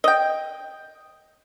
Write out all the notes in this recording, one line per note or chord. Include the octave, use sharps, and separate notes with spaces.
D#5 G5